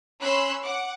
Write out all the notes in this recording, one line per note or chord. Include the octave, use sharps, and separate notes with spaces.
C#4 B5 C6 E6 F#6
F#5 D6